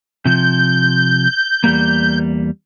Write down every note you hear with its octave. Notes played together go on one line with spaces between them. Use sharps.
C3 F3 G6
E2 G3 A#3